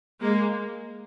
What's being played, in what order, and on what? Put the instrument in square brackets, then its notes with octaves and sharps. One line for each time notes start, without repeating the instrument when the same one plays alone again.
[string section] G#3 A#3